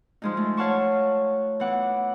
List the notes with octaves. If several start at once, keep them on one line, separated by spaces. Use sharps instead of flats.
F3 G#3 D#4
A3
C#5 F5 F#5 A5 C#6
E3 B3 F#5 D6